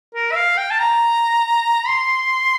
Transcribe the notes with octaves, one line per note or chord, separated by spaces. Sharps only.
A#4
E5
F5
G5
A5
A#5
C6